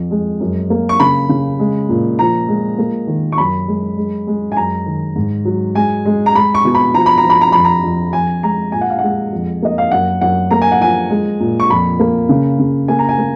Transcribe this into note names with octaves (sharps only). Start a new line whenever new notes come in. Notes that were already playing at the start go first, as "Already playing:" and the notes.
Already playing: F2
G#3
F#2
A#3
C#6
C#3 B5
C#3
G#3
A#2
F3 A#5
G#3
A#3
D#3
C#6
F#2 B5
G#3
G#3
G#3
G#5
F#2 A#5
D#3
G#2
F#3
G#3 G#5
G#3
A#5
G#3 B5
C#6
B2
B5
F3 A#5
B5
A#5
F3
B5
A#5
F2 B5
A#5
F2
F2 G#5
G#3 A#5
A#2 G#5
F#5
F5
G#3 F#5
F2
A#3 D#5
F5
F#2 F#5
F#2 F#5
A#3 A#5
G#5
F#5
F3 G#5
G#3
A#2
C#6
F2 B5
A#3
C#3
C#3
A#3 G#5
A#5
G#5
A#3